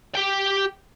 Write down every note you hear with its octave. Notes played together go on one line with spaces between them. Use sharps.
G4 G5